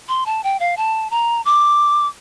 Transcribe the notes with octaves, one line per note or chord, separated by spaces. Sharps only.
C6
A5
G5
F5
A5
A#5
D6